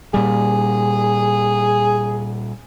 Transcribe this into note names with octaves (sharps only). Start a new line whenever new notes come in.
A#2 G3 G#4